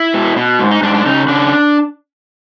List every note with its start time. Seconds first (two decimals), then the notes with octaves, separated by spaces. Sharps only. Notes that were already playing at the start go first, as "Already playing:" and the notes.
Already playing: E4
0.14 B2
0.36 B2
0.59 G#2
0.71 D#4
0.82 G#2 D4
0.94 D4
1.06 C#3 D#4
1.28 C#3 D4